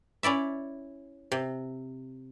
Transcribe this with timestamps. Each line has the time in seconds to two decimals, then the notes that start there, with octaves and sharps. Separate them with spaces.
0.23 C#4 E4 D5 E5
1.32 C3